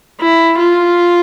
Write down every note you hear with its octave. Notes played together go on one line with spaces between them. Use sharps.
E4
F4